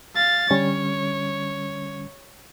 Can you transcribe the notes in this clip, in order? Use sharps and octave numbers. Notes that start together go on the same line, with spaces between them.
F5 A6
D3 G3 C#4 C#5